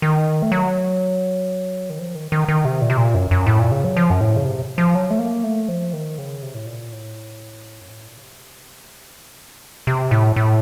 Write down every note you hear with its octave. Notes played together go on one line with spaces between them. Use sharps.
D#3
A3
F#3
D#3
F3
D#3
D#3
D#3
C3
A#2
C3
A#2
F#2
F#2
A2
A#2
C#3
F#3
F3
F#2
A2
C#3
C3
F3
F#3
A3
A#3
A3
F3
D#3
C#3
C3
A2
A#2
A2
F#2
A2
A#2
C#3
C3
C#3
C3
C#3
C3
A2
A2